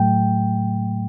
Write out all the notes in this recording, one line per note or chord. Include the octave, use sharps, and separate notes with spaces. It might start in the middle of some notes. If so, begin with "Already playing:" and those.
Already playing: A2 F#3 A3 G5